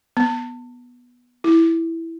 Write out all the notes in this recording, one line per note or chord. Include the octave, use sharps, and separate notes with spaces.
B3
E4